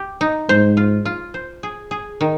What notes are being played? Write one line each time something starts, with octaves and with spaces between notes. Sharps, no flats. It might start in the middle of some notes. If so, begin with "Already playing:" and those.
Already playing: G4
D#4
G#2 C5
F4
F4
C5
G#4
G#4
D#3